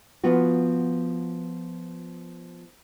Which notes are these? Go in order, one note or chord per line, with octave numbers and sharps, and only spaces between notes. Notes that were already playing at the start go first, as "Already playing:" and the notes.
F3 B3 F4 F#4